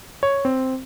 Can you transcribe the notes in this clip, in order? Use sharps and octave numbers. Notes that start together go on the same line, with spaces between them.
C#5
C4